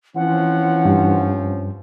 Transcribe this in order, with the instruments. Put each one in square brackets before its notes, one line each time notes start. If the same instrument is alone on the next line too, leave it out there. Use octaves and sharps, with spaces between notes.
[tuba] E3 [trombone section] F3 C4 C#4 [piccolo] F#5
[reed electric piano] G2